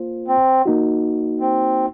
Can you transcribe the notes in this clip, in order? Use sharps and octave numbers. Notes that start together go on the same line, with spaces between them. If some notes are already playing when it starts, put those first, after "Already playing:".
Already playing: A#3 F4 C5
C4
A#3 D#4 F#4
C4